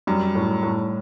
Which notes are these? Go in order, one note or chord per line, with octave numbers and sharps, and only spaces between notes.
F#2 G3
A2
A2